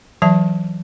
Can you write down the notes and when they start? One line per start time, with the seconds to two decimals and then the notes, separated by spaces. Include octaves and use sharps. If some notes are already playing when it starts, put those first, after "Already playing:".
0.22 E3 F#3 E5 A5